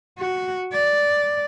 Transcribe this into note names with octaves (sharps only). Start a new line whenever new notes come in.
F#4
D5